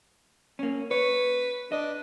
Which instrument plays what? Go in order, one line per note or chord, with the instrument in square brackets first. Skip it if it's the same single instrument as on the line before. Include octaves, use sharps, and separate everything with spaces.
[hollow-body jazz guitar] A#3 C#4
[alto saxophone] B4 [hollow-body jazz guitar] C#5
[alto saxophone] D4 [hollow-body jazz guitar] D#5